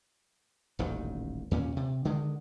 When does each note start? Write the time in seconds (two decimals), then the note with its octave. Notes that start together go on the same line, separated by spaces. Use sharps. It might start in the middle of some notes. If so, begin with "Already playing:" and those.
0.79 D#1 A1 D2 D#3
1.51 D#2 A#2 C#4
1.77 C3
2.05 D3 D#3 G#3